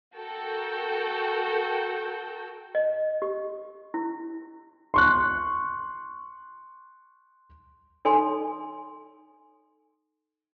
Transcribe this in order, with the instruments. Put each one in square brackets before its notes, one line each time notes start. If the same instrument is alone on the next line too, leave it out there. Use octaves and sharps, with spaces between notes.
[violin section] F#4 A4 A#4 G5 E6 G6
[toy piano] D#5
G4
E4
[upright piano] C6 C#6 F#6
[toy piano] D#4 A4 C#5 G#5 C6